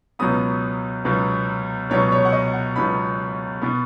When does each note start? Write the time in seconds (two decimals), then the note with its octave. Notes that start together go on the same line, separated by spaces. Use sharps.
0.19 C#2 B2 F#3 B3 D#6
1.04 C#2 B2 F#3 B3
1.90 C#2 B2 F#3 B3 C#5
2.12 C#5
2.25 F#5
2.32 D#5
2.54 F#5
2.76 C#2 B2 F#3 B3 B5
3.62 B2 B3